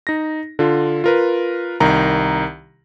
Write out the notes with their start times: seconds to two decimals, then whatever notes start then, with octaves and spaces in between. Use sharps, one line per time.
0.07 D#4 A#6
0.59 D3 F4
1.04 F4 A#4 B4
1.80 C2 D#3 A#5